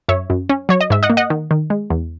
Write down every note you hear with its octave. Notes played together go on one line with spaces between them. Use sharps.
F#2 C#5 E5
F#2
C#4
F#3 C#5
D#5
G#2 E5
D#5 F#5
A#3
D#5 F#5
D#3
D#3
G#3
E2